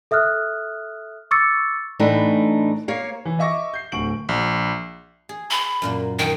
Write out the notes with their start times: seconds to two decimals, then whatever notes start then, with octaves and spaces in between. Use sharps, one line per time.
0.11 A4 E5 D#6 F6 F#6
1.31 C#6 D6 E6 A6 C#7
1.99 A2 E3 A3 D4 D#4
2.88 A#3 C#5 F5
3.25 E3
3.39 D#5 E5 C#6 D6 A#6
3.74 G6 C7
3.92 D1 D2 C#6 D7 F#7
4.29 A#1
5.29 G#4
5.51 B5
5.82 F#2 A#2 A#3
6.19 D#3 G5